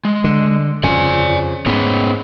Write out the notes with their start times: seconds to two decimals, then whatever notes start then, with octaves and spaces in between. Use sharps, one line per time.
0.05 G#3
0.24 D3
0.84 F2 C#3 D5 G#5
1.66 G#2 B3 C#4